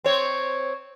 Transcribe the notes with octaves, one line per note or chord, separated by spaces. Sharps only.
C4 C#5